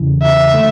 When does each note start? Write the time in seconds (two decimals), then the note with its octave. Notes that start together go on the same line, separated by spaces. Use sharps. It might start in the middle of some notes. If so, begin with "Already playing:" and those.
Already playing: E2 C#3 E3
0.22 E5
0.54 D3 A3